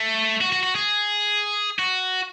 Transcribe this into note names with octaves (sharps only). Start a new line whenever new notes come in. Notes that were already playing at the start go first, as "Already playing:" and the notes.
Already playing: A3
F#4
F#4
F#4
G#4
F#4